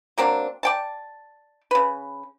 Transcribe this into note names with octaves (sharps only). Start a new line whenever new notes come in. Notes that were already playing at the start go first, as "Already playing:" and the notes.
F#3 A#3 C4 D4
D5 G5 A5
C#3 B4